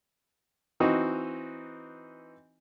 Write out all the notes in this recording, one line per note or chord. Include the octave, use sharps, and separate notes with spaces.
E3 C4 D#4 F#4